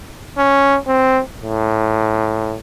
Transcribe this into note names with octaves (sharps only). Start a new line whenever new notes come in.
C#4
C4
A2